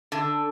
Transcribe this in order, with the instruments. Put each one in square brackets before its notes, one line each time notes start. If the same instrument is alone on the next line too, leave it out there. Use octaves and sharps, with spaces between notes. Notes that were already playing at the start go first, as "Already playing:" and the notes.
[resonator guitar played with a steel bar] D3